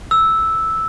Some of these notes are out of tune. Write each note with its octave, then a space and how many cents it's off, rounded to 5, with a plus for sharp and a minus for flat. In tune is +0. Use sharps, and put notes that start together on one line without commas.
E6 -5